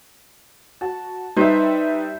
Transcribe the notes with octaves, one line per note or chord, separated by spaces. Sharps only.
F#4 A5
G3 D#4 B4 C5 E5